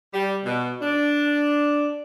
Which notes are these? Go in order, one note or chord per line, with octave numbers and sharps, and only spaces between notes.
G3
B2
D4